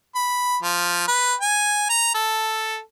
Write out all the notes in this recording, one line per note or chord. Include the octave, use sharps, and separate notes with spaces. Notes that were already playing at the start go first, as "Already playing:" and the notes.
B5
F3
B4
G#5
A#5
A4